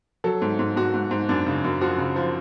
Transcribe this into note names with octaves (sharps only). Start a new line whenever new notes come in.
F#3 A4
G#2
G#2
G#2 F#4
G#2
G#2
F#2 D4
C#3
F#2
F3 F#4
C#3
F3